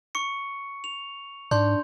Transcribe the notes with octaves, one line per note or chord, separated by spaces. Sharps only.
C#6 C#7
F7
G#2 D4 C6 G6